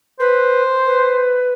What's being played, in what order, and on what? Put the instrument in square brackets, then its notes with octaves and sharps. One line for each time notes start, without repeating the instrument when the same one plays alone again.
[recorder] B4 [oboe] C5
[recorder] B4